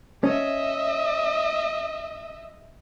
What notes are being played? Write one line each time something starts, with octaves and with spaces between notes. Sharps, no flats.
C#4 D#5 E5